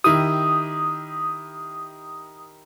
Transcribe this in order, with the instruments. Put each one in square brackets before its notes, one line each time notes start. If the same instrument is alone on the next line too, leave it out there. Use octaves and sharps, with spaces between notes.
[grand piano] D#3 E4 G4 [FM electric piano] D#6